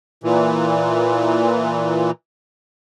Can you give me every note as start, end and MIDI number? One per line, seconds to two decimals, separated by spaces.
0.24 2.11 46
0.24 2.11 52